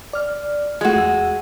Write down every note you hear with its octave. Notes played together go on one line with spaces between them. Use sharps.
D5 F6
G#3 A3 F4 F#4
E2 E6